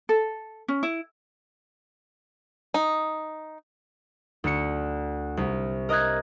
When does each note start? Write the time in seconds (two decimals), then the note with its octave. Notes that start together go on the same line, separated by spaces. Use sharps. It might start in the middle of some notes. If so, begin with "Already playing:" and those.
0.09 A4
0.68 C#4
0.83 E4
2.74 D#4
4.44 D2 C#7
5.37 C2
5.89 A#4 D#5 D#6 F#6 G#6